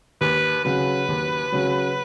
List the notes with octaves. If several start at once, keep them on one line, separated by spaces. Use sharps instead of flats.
D#2 B4
C#3 F#3 B4
D#2
C#3 F#3